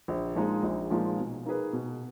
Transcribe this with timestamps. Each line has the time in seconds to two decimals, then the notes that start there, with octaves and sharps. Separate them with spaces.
0.08 A#1
0.35 A#2 F3 G#3 D#4
0.63 A#1
0.90 A#2 F3 G#3 D#4
1.19 B2
1.46 A#3 D#4 G#4 B4
1.73 B2